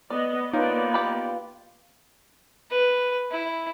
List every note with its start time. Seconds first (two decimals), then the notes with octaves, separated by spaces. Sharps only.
0.10 B3 D5 D#5
0.53 A#3 B3 C#4 D#4 F4 B4 D5
0.94 G4 B5
2.71 B4
3.31 E4